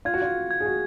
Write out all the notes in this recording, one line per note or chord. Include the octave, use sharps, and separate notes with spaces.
F4 G#6
F#4
F4
G#6
G#4
F#4